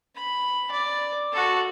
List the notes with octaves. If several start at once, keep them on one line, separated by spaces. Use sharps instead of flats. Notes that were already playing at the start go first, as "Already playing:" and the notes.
B5
D5
F#4 A4